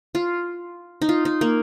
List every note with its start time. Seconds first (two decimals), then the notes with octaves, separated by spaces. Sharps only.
0.15 F4
1.02 D#4
1.09 F4
1.25 D#4
1.41 A#3